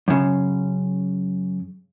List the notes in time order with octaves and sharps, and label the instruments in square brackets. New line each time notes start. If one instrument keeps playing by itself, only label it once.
[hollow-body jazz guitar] F#2 C#3